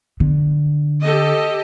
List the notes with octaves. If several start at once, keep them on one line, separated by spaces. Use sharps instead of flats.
D3
G4 A4 D#5